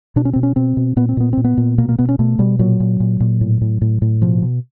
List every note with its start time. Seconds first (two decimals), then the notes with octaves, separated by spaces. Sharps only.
0.16 B2 D4
0.25 C#4
0.33 B2 C4
0.43 C#4
0.56 B2 C4
0.77 B2
0.96 A#2 B3
1.09 C4
1.17 A#2 B3
1.33 A#2 C4
1.44 B3
1.57 A#2
1.78 B2 A#3
1.89 A#3
1.99 B2 B3
2.09 C#4
2.19 B2 A3
2.39 B2 G3
2.59 A#2 F#3
2.80 A#2
3.00 A#2
3.20 A#2
3.41 A2
3.61 A2
3.81 A2
4.02 A2
4.22 B2 F3
4.42 B2